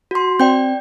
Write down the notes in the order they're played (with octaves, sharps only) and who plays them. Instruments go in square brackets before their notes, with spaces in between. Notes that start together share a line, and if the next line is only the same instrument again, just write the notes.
[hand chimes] F#4 C6
[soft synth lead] C4 [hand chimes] D5 G5 G6